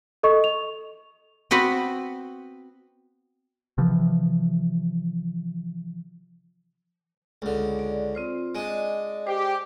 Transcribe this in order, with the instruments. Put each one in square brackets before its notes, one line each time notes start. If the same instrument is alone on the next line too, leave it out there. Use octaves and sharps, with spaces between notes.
[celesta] A4 D#5 C#6
F7
[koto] B3 C4 F#4 B4
[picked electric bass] C3 E3 F3
[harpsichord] C#2 D3
[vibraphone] D5
C4 F4 C5
[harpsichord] G#3 D4 [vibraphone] D5 D#5
[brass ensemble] G4 [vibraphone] C5